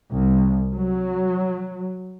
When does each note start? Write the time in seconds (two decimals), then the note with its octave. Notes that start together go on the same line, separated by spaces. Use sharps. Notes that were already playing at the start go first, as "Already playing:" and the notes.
0.11 C2
0.73 F#3